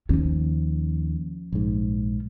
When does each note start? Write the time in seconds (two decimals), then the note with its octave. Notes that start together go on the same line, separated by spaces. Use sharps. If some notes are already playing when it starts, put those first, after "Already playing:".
0.09 D#2 F3 C#4
1.52 A#1 G#2